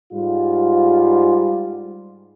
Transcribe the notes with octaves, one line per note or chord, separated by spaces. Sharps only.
G#2 G3 F4